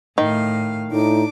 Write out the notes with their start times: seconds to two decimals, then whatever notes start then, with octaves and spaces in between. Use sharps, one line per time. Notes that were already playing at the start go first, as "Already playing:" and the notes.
0.18 A2 D#3 F5
0.91 A2 D4 D#4 D6